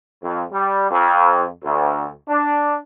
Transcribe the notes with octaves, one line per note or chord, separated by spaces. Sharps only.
F2
G3
F2
D2
D4